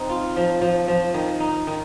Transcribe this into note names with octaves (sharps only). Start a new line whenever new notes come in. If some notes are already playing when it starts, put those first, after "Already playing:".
Already playing: C4 D#4
F4
F3
F3
F3
D#3
D#4
D#3